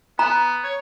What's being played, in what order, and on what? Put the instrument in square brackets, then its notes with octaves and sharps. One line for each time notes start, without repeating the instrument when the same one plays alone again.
[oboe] B3 [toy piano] A#5
[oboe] C#5